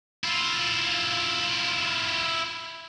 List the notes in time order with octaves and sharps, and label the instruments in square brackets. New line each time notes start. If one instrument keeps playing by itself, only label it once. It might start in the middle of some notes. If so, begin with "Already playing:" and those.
[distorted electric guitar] E4 F4